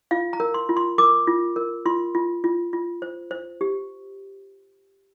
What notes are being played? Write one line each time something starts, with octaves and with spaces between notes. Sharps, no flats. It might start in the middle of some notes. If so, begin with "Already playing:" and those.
F4 F5
A#5
A#4
C6
F4
C6
A#4 D6
F4
A#4
F4 C6
F4
F4
F4
C5
C5
G4